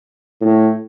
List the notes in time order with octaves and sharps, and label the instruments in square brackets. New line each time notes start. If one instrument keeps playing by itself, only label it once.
[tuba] A2